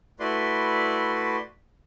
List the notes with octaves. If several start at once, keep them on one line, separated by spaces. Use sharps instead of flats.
A3 E4 F#4 B4 D5 C6